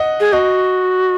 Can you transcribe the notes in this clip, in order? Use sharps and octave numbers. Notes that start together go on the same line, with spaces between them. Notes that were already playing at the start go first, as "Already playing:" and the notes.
Already playing: D#5 F#5
G#4
F#4 D#5